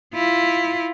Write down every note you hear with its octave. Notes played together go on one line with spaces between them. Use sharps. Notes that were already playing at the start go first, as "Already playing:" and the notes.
E4 F4